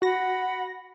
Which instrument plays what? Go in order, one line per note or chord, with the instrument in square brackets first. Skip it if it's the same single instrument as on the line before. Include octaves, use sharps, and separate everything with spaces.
[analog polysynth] F#4 A#6 [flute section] F#5 B5